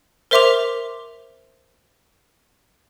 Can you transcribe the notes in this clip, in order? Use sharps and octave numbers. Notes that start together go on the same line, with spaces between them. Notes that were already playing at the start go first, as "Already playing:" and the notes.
A#4 C5 E5 C6 D6 F7